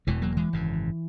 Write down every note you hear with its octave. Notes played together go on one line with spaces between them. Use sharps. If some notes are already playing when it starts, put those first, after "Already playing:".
E1 E2 B2 E3 G#3
F#3 A#3
E3 G#3
G#1 F#2 C#3